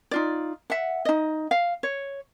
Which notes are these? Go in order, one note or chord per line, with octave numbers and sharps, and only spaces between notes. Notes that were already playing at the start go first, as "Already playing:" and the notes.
D#4 F4 D5
E5 F#5
D#4 D#5
F5
C#5